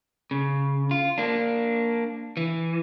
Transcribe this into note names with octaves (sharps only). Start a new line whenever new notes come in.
C#3
F4
A#3 D4
E3